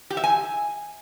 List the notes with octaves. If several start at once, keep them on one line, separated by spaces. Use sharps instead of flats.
G4
E5
G#5